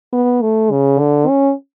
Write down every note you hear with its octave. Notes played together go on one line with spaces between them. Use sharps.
B3
A3
C#3
D3
C#4